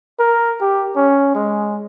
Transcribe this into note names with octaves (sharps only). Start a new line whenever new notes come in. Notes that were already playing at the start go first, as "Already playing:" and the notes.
A#4
G4
C#4
G#3